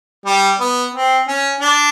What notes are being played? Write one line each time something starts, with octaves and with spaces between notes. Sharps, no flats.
G3
B3
C4
C#4
D4